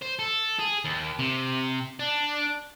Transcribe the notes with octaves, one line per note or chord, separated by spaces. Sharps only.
C5
A4
G#4
D#2
C3
D4